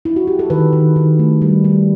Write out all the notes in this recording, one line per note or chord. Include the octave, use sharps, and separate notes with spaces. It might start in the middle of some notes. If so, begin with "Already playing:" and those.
E4
F#4
G4
A4
D#3 B4
D#3
D#3
A3
G3
G3